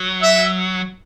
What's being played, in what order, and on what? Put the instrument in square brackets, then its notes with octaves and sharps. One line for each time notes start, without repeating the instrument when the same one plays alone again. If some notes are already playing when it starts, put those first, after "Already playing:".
Already playing: [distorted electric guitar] F#3
[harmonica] E5